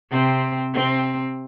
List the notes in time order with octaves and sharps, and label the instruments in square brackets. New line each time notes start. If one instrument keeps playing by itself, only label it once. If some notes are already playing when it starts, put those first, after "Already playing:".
[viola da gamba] C3 C4
C3 C4